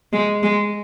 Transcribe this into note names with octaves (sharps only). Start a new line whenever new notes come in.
G#3
G#3